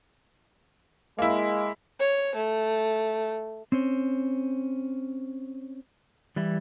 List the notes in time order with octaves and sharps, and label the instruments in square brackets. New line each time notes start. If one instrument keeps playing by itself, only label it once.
[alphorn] G#3 [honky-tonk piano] A#3 E4
[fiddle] C#5
A3
[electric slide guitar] C4 C#4 C5
E3 G3 E4